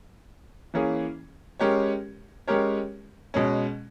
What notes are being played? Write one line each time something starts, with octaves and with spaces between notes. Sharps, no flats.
E3 A#3 C#4 G#4
G#3 C#4 G4 A#4 C#5
G#3 C#4 G4 A#4 C#5
B2 G#3 C#4